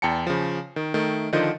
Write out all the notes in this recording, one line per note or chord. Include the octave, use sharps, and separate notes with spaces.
E2 G5 A5 C#7
C#3 F3
D#3
D#3 A3
D3 D#3 F3 F4 D#5 G6